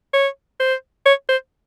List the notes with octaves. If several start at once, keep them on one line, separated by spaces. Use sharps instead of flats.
C#5
C5
C#5
C5